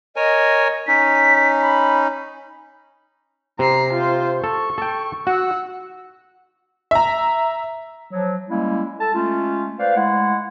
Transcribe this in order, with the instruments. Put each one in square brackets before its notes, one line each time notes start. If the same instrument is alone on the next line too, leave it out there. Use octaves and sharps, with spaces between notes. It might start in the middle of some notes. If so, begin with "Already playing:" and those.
[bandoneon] A#4 C#5 G#5 [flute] D#5
[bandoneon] C#4 D#4 [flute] B6
[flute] B5
[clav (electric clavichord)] C3 [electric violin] A#5 C7
[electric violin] F4 C5
[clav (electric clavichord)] A4 [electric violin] C#6
[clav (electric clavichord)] A4 G5
[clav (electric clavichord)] F#4 [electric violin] F#5 E6
[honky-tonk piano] E5 A#5
[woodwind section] F3 F#3
G3 G#3 A#3 C#4 E4
A4 A5
G#3 A3 C#4 F4
B4 C5 D5 F5
G#3 A3 E4 F#5